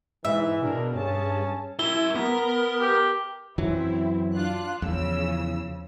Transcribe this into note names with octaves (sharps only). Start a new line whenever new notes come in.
G#2 E3 E5
B2 D4 G#4 A#4
G2 C#4 G#4 A5
E4 A#4 E5 G7
B3 A#4
G4
F#2 E3 F#3 C4 E4
D4 F4 F#6
E2 C#3 F3 E6